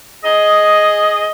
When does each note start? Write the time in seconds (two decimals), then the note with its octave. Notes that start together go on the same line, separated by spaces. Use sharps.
0.24 G#4 D#5